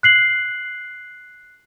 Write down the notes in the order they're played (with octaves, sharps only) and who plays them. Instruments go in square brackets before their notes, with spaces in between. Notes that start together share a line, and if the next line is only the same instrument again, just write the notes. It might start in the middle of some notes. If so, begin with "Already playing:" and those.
[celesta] F#6 C7 F#7